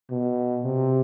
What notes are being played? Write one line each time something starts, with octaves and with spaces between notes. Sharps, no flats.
B2
C3